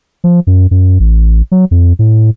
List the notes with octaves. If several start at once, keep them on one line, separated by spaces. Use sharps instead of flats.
F3
F#2
F#2
A1
F#3
F2
A2